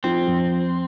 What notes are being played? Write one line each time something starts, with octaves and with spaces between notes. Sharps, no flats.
F3 C4
F2